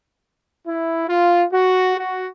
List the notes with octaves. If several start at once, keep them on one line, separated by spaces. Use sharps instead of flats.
E4
F4
F#4
F#4